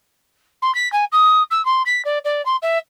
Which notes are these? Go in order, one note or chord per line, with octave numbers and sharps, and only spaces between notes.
C6
B6
G#5
D#6
E6
C6
B6
D5
D5
C6
E5